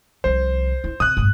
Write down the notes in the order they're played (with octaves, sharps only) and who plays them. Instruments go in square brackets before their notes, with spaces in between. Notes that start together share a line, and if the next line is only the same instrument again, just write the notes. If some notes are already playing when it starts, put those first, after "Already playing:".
[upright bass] C2 F3 [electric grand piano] C5
[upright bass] E4
[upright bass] C3 [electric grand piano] D#6 F#6
[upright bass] G#1 F#2